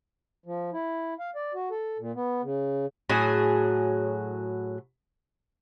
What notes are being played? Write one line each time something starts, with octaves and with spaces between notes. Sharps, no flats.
F3
E4
F5
D5
F#4
A4
A#2
B3
C#3
A2 F#3 G#4